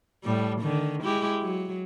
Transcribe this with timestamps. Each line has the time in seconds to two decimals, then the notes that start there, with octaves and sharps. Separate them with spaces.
0.24 A2 G3
0.61 D3 D#3
1.03 G#3 E4 G4
1.42 F#3